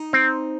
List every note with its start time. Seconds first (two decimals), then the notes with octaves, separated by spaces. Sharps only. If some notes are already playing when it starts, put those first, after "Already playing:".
Already playing: D#4
0.13 C4